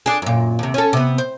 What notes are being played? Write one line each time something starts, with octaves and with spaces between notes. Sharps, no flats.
D4 G#4
F#2 A#2
D#2 C3
C#4 A4
C3 B3
C5